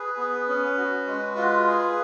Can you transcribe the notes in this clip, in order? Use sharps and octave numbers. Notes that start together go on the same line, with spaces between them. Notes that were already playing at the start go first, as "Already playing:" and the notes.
Already playing: G#4 B4
B3
C#4
F#4
G#3
F4
G#4